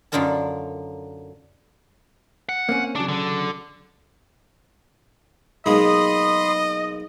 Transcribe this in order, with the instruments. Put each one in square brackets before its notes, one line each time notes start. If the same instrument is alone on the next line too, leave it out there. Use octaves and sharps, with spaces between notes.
[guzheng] F#2 D3 D#4 F4 A#4 A5
[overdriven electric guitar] F#5
[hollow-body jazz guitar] A#3 C4 C#4
[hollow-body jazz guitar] C#3 F#3 [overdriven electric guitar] D4
[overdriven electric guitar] D3
[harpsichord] B1 G#3 A#3 [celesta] D#4 [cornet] D#5 [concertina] B5 C6 D#6